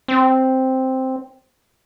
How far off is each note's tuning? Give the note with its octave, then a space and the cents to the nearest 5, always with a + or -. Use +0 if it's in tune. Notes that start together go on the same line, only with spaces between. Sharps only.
C4 +0